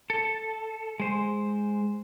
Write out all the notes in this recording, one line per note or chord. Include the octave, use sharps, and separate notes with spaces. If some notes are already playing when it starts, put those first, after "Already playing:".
A4
G#3 C5